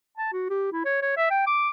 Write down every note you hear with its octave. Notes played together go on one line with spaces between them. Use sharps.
A5
F#4
G4
E4
C#5
C#5
E5
G5
D6